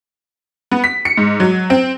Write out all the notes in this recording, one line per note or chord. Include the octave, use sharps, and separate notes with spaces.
B3
B6
C#7
G#2
F#3
C4